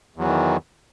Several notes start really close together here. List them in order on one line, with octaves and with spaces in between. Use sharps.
E2 F#3 E3 D#3